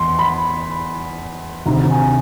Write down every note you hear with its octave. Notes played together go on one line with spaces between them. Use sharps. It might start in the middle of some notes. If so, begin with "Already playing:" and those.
Already playing: E2 C6
B5
D2 C3 D#3 A#5
G#5